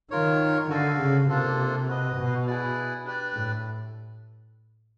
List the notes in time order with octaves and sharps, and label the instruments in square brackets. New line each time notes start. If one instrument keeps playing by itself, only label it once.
[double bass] D#3 [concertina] F4 A#4 C#5
[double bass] D3 [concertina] F#4 A4 D5 F5
[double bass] C#3
[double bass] C3 [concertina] A#3 D4 F4 A4
[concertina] F#4 B4 D#5
[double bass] B2
[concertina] E4 G#4 B4 D5
D4 G4 B4 D5
[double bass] A2